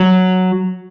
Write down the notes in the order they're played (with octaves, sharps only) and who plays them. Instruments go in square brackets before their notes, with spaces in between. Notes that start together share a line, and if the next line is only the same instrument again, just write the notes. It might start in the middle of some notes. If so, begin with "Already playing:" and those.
Already playing: [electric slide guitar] F#3